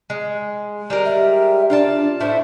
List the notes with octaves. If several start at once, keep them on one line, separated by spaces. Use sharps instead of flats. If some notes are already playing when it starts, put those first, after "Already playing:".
G#3
G3 G#3 A#4
E5
D4 F4 D5 A5
A2 E4 C5 E5